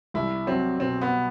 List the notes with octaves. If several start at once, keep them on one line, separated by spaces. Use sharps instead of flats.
C2 E4
F#3 C4
B2 C4
B3